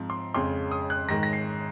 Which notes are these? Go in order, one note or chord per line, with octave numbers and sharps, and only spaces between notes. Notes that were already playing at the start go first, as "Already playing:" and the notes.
Already playing: G#2 F3 C4
C6
F2 C#3 G#3 C4 C6
D#6
F#6
G#2 D#3 G#3 A#6
A#6
C7